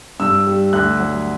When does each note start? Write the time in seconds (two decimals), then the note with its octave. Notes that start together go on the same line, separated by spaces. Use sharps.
0.20 G2 E6
0.47 G3
0.73 D2 F#6
0.99 F#3